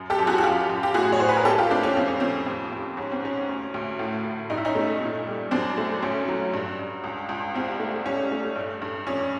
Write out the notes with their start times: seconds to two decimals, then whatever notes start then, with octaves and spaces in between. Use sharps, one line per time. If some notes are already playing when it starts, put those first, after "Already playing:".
Already playing: F#2
0.10 G4 A4
0.19 F#2
0.27 F#4 G#4
0.38 F#4
0.43 F#2 F4 G4
0.69 F#2
0.83 G4
0.94 A2 F#4 G#4
1.12 C#5
1.20 A2 C5
1.29 B4
1.37 A#4
1.45 C2 G4 A4
1.58 F4 G4
1.70 A3 C4 D4
1.83 C#4
1.96 F2 C4
2.08 C#4
2.20 F2 C4
2.46 D#2
2.72 D#2
2.97 G#2 C#4
3.11 C4
3.23 G#2 C#4
3.49 D2
3.74 D2
3.99 A2
4.24 A2
4.50 G2 D#4
4.57 E4
4.65 C#4 D#4
4.75 A3
5.01 A#2
5.27 G3
5.51 F#2 C4 D4
5.78 A3
6.02 D2 C#4
6.28 F#3
6.54 G2
6.79 G2
7.04 C#2
7.29 C#2
7.54 C2 C4
7.80 A3
8.05 C2 C#4
8.32 A3
8.56 G2
8.82 G2
9.07 F2 C#4